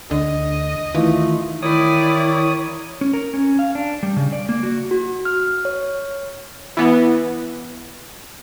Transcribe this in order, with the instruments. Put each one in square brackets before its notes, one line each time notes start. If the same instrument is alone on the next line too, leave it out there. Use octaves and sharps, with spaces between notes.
[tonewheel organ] D2 [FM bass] D3 [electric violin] D#5
[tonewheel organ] D#3 F4 [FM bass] E3 [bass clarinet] A3
[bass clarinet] D#3 [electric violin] E4 D5 [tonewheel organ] C#5 D#6
[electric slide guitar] C#4
A#4
C#4
F5
D4
G3
C#3
D5
A#3
F#4
[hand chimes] F#4
F6
C#5
[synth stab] E3 B3